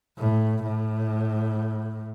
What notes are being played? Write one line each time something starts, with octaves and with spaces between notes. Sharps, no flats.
A2
A2